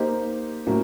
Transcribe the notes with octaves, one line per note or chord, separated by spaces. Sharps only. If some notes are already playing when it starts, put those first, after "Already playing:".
Already playing: A#3 D#4 G4 C5
A2 F#3 A#3 C#4